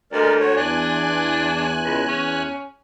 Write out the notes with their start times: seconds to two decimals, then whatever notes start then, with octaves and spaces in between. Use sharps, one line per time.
0.12 D2 G#3 A#4 D5
0.40 F#4 C#5
0.56 E2 D4 G#5 F#6
1.84 C#2
2.08 C#4